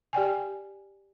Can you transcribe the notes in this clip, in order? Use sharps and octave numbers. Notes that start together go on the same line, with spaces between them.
G4 D5 G5 G#5